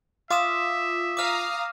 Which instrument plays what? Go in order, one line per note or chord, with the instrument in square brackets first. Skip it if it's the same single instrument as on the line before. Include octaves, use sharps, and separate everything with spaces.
[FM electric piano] F4 [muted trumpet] E5 [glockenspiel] D6 D#6 E7
[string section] F5 A#5 D#6 [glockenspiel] D6 F6